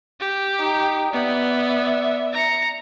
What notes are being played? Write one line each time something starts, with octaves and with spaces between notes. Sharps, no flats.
G4
D#4 G5
B3 D5 E5
A#5 C#7